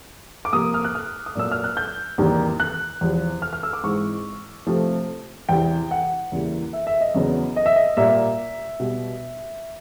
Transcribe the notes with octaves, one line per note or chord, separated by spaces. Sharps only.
D6
C3 F3 A#3 D#6
F6
F#6
F6
D#6
A#2 F#3 A#3 E6
F6
F#6
G6
E2 C3 D#3 G3 A#3
F#6
E2 C3 F3
F6
F6
E6
D6
G#2 E3 G#3 C4 C#6
C3 F3 A3 C4
E2 C3 E3 G5
F#5
E2 C#3 E3 G3 A#3
E5
E5
D#5
E2 C#3 F#3 B3
D#5
E5
D#5
A#2 G3 A#3 E5
B2 G3 B3